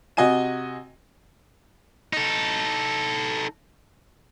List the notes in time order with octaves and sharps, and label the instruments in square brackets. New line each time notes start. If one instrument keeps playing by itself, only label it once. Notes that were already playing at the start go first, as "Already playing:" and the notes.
[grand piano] C3 F#4 D#5 G#5 D#7
[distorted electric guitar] D#4 A4